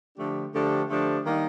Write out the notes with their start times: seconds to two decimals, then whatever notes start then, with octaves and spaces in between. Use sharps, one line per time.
0.17 D3 F3 A3 D4 G4
0.53 D3 F3 A3 D4 G4
0.89 D3 F3 A3 D4 G4
1.26 D#3 G3 A#3 D#4